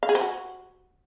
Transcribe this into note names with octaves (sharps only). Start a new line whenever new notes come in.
F5
G#4
C5
F#4